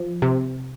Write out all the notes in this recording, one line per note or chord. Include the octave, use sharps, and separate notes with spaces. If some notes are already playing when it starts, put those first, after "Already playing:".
Already playing: F3
C3